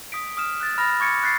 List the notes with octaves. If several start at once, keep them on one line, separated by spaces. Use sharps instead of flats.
D#6 B6 D7
D#6 F6 E7
F#6 A6
B5 F6 A6 A#6
C#6 D6 G#6 A6 C#7 D7
F#6 A6 B6 C7